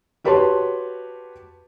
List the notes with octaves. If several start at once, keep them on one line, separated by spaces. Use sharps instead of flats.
F#4 G4 B4 C#5 A5 C6